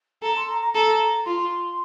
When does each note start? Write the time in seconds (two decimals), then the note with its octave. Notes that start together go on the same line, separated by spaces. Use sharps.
0.22 A4 A#5
0.36 C6
0.49 A#5
0.61 A#5
0.74 A4 A#5
1.25 F4 C6